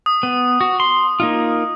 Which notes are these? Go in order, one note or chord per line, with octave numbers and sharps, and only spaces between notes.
D#6
B3
F#4
C6
A#3 D#4 F4